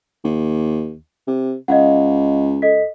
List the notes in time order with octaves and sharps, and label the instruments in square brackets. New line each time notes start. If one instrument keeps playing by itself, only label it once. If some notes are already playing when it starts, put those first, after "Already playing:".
[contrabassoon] D#2
C3
[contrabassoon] C#2 [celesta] D#5 F5 F#5
[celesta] A4 D#5 B6